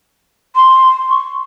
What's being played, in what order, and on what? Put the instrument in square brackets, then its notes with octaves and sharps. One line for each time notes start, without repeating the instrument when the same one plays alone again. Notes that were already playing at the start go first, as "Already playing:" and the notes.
[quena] C6
C#6